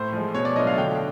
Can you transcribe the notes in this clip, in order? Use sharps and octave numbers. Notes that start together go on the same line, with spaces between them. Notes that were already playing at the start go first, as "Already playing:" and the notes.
Already playing: A2 C5
F3 G#3
B2 C#5
D5
F#3 A3 D4 F4 D#5
F5
D3 G5